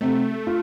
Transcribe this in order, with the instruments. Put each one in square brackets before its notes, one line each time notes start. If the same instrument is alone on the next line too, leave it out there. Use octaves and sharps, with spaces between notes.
[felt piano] C3 [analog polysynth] A3
[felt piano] F4